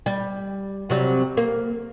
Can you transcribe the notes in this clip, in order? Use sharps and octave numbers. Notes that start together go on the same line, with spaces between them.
G3
C3 F#3 G3
A#3